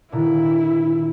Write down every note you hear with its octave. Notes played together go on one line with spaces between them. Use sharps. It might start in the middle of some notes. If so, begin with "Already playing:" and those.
A#2 D3 D#3 E4